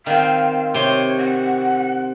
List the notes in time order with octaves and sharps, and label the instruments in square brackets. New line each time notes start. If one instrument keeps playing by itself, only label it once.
[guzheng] D#3 C4 [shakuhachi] F5
[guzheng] C3 C6 [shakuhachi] C#5
[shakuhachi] F#5